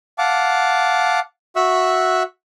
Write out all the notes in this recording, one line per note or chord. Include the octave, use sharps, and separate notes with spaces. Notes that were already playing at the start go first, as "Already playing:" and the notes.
F5 F#5 A5 D6
F#4 E5 C#6 E6 F#6